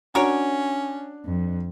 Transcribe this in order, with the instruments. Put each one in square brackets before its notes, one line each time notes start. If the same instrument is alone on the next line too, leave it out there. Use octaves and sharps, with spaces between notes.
[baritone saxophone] C#4 [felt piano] D4 [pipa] F#4 A#4 C#5
[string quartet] F2